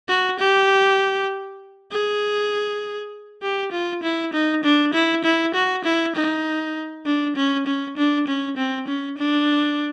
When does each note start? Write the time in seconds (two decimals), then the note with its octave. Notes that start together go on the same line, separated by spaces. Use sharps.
0.09 F#4
0.39 G4
1.91 G#4
3.42 G4
3.72 F4
4.03 E4
4.33 D#4
4.64 D4
4.94 E4
5.24 E4
5.54 F#4
5.85 E4
6.15 D#4
7.06 D4
7.36 C#4
7.67 C#4
7.97 D4
8.28 C#4
8.57 C4
8.88 C#4
9.18 D4